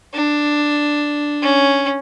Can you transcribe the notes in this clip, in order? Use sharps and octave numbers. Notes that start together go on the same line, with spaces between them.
D4
C#4